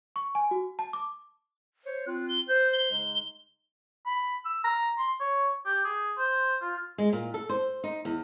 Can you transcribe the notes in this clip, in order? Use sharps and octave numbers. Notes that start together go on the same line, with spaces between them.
C#6
G#5
F#4
A5
D6
C5 C#5
C4 F4 F#6
G7
C5 G6
G7
C#3 G#3 D#4
B5
E6
A#5
C6
C#5
G4
G#4
C5
F4
G#3
A#2
A4
C5
D#4
E2